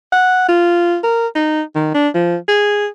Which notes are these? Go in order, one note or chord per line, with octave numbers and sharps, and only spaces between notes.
F#5
F4
A#4
D#4
D#3
D4
F3
G#4